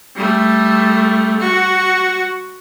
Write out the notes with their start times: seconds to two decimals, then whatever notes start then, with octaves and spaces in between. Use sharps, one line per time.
0.16 G3 A3
1.40 F#4